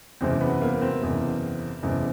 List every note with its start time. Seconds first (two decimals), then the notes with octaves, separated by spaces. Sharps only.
0.21 F#1 E2 C3 C4
0.41 B3
0.61 A#3
0.82 C4
1.01 F#1 E2 C3
1.82 F#1 E2 C3